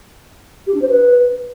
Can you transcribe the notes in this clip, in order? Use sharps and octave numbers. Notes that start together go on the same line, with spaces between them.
G4
D4
C5
B4